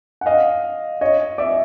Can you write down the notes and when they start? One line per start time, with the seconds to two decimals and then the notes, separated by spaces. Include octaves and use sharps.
0.21 F#5
0.26 D#5 F5
1.01 C#5 D#5
1.38 D5 E5